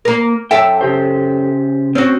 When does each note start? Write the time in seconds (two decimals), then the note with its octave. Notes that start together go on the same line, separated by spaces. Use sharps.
0.05 A#3 A#4
0.51 F#2 A4 E5 G5
0.81 C#3 G4 C5
1.95 C4 C#4 F#4